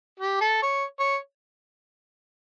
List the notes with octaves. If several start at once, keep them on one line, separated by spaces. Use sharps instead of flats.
G4
A4
C#5
C#5